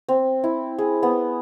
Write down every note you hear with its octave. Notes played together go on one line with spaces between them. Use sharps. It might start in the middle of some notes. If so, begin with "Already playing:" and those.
C4
E4
G#4
B3